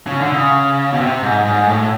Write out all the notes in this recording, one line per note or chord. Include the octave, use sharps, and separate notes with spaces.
C#3
D3
C#3
B2
C3
G#2
G#2
A2